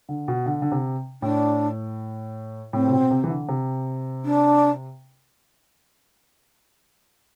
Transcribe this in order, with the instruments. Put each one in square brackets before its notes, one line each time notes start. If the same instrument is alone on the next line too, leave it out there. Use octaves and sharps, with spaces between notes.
[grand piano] D3
B2
D3
D3
C3
[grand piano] A2 [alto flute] D4
[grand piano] A2 [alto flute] C4
[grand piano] C3
B2
C3
E3
D3
C3
[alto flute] D4